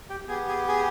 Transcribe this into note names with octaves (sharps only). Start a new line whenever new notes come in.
G4 G5
B3 G4 G#4 G#5
G#4 G#5
G#4 G#5